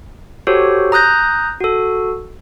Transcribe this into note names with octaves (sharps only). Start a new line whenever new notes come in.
F#4 G4 A4 C5 C#5
A#5 D#6 F#6 G6 A#6
F#4 A4